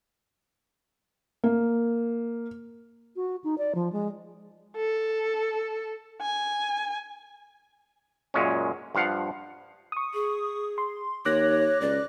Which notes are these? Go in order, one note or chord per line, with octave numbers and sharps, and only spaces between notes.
A#3
F#4
D#4
D5
F3
G#3
A4
G#5
F#2 A#2 G#3 C#4
G2 F3 F5 F#5
C#6 D#6
G#4
C6
D#2 C#5 D6 F#6 A#6
C#2 D5